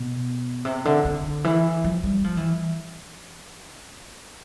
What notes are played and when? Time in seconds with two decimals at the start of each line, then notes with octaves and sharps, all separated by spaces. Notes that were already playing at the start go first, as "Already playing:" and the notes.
Already playing: B2
0.65 C3
0.85 D3
1.05 D3
1.44 E3
1.84 F3
2.04 G3
2.24 F3
2.37 E3